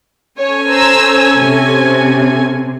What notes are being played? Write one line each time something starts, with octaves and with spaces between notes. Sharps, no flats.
C#4 A4 C#5 G#5
C5 A#5 E6
C3